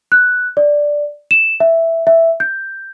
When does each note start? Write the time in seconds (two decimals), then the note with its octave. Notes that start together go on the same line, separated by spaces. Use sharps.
0.12 F#6
0.57 D5
1.31 E7
1.60 E5
2.07 E5
2.40 G6